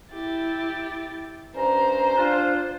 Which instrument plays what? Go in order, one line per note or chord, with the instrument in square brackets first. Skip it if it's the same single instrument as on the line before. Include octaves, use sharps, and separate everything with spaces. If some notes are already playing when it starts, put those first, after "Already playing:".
[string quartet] E4 G4 A6
[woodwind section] G2 C#4 A#5 [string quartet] C5
[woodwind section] D4 F4